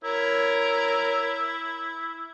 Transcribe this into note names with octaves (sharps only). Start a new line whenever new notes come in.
E4 A#4 C#5